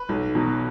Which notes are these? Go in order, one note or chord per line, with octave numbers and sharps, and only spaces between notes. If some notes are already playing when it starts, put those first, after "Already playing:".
Already playing: B4
B1
B2 F#3